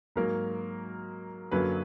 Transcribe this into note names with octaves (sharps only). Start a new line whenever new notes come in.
G#2 F#3 A#3 A#4
F#2 D3 F#3 A#3 B4